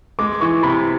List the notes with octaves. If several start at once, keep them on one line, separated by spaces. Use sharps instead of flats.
G#3 D6
E3 C#6
C3 B5